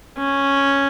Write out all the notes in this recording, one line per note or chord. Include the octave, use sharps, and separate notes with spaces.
C#4